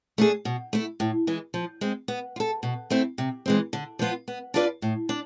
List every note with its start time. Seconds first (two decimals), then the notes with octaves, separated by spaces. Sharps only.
0.18 A3 D4 G#4
0.45 B2
0.73 A3 E4
1.00 A2
1.27 E3 G#3
1.54 F3
1.81 G#3 C4
2.08 B3
2.36 F4
2.40 A4
2.63 B2
2.90 A3 C4 E4
3.18 C3
3.46 E3 G#3 C4
3.73 D3
3.99 F3 B3 F4
4.28 B3
4.54 D4 F4 B4 D5
4.82 A2
5.09 D4